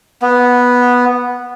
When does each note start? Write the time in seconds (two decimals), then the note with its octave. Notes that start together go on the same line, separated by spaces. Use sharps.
0.22 B3